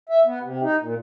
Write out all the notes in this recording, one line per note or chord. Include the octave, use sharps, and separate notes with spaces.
E5
B3
C3
D#4
A#2